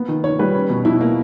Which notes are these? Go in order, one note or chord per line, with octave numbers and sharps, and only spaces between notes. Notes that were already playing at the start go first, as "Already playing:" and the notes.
Already playing: A#3 B3
D#3
D#3 C#5
G3 B4
C#4
B2
B2 E4
A#3